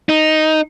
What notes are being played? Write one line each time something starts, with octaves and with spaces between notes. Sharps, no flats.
D#4